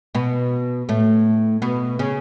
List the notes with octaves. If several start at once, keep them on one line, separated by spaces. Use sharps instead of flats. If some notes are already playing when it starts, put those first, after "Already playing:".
B2 B3
A2 A3
B2 B3
C#3 C#4